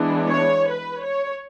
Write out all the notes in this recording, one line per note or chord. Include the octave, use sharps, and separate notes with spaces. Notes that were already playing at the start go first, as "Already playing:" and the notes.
Already playing: E3 G#3 B3 D4
C#5
B4
C#5